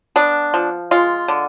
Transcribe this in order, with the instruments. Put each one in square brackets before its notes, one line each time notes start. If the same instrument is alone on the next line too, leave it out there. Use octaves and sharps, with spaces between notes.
[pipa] B3 D4
F3
G#3 F4
D3